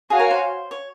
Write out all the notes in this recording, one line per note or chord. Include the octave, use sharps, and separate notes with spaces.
F#4 G#4 C#5 F5 G#5
A#4
C5
C#5